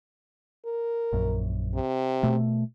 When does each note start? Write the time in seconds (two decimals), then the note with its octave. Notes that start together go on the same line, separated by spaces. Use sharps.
0.65 A#4
1.13 A#1 F#2
1.75 C3
2.23 B2 A3